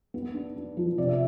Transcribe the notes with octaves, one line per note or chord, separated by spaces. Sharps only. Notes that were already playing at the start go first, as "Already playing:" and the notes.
B3
D4
D4
F3
C3 D5
E5